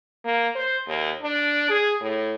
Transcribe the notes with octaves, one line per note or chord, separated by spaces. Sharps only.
A#3
C5
D#2
D4
G#4
A2